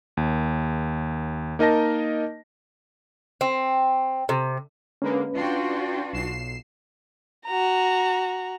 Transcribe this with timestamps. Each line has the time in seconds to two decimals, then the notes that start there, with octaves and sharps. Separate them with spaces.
0.17 D#2
1.59 A#3 D#4 A#4 D#5 A5 A#6
3.41 C4
4.29 C3
5.02 D3 G#3 A#3 C#4 B4
5.35 D4 F4 F#4 G5 C6
6.13 B1 C7 E7
7.46 F#4 A#5